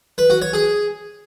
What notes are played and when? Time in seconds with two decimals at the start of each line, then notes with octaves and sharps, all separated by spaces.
0.18 B4
0.30 F#4
0.42 C#5
0.53 G#4